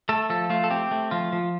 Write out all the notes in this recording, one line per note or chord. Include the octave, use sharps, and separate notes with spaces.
A3 A4
F3 A4
A3 F4
A4
C4 G4
A3
F3 F4
F3